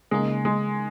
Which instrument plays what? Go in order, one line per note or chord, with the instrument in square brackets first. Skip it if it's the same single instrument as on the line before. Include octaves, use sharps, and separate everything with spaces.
[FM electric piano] C#3 A#3 D#4 [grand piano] G#3
[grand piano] G#3